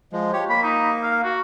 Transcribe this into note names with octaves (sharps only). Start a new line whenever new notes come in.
F3 G#3
G4 C#5
A#3 B5
D#4
F5
F#4